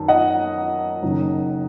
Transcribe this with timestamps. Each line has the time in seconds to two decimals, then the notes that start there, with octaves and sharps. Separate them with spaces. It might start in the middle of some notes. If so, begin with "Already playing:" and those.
Already playing: F#2 D#3 F#3 A5
0.08 D#5 F#5
1.02 F#1 F#2 D#3 F#3